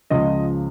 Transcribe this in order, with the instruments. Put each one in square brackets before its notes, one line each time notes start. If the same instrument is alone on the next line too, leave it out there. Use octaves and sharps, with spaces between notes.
[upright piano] C#2 C#3 F3 D#5